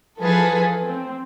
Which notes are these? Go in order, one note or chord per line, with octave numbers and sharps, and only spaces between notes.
E3 F3 G#4 A4 B4 F5
C4